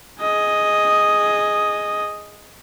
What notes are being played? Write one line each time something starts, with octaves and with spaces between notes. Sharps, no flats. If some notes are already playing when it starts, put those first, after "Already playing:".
G#4 D#5